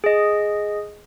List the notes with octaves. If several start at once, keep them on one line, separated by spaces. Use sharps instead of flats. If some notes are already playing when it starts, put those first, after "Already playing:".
G#4 D#5